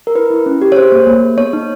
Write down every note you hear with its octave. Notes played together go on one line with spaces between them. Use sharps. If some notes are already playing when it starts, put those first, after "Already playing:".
A#4
E4 B4
E4
C#4
G4
C#5
G#4 C5
A#3
A#3
G#4
B3 C#5
D#4